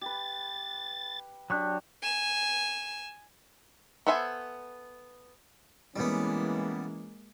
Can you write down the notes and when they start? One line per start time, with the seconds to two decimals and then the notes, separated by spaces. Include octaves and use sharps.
0.02 G4 B4 A6
1.50 F#3 D4 G4 C#6 F#6
2.02 G#5 E7
4.07 B3 A4 C5 E5 G#5
5.96 E3 G3 G#3 A#3 B3 C#4